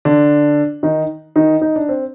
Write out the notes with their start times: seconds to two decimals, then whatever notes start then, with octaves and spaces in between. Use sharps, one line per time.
0.05 D3 D4
0.83 D#3 D#4
1.36 D#3 D#4
1.62 D#4
1.76 D4
1.89 C4